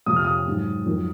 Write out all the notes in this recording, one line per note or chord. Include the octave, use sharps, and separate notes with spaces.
F2 C3 F3 D#6
F6
D#6
G#2 F#3
F2 D#3 F#3